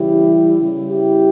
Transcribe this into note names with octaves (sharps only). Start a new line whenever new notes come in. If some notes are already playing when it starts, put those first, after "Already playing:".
Already playing: C#3 E3 G3 E4 G4
C#3 G3
E4 G4